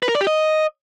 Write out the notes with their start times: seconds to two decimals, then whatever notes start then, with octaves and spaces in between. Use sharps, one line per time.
0.03 B4
0.09 A#4
0.15 D5
0.21 G4
0.27 D#5